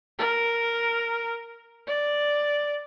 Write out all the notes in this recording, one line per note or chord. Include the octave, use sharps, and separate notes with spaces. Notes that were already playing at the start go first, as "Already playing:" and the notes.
A#4
D5